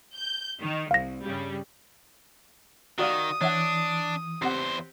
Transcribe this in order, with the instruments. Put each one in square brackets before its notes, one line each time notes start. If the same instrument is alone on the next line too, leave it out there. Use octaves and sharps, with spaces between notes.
[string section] G6
D#3
[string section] C2 [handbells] F5 A#6
[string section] G2 C#3 G3
[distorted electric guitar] D#3 [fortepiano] F#4 D5 F5 [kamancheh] D#6
[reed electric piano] E3 [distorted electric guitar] D4 [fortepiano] C#5 E5 F#5
[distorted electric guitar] E2 C5 [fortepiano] C4 G4 F#5